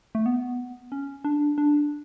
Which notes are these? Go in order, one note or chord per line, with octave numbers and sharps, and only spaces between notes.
A3
B3
C#4
D4
D4